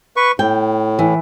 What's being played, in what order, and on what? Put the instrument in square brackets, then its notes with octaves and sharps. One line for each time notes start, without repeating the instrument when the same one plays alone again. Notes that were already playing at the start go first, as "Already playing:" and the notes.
[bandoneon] B4 C#6
[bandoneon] A2 [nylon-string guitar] G5
[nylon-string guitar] E3